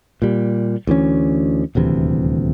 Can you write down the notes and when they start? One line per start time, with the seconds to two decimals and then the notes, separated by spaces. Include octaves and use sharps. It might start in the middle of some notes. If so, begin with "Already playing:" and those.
0.22 A#2 G3
0.87 D2 E3 C#4
1.75 D#1 D2 C3 E3